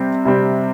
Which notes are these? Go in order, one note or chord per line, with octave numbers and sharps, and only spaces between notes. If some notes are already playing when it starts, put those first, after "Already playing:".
Already playing: C3 G3 C4
C3 G3 C4